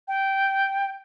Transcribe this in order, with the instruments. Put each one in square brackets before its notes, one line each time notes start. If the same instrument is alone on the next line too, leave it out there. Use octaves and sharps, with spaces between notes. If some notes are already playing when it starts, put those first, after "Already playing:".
[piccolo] G5